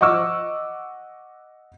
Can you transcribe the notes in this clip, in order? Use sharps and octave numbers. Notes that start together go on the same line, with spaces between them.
D#5 F#5 C#6 D6 E6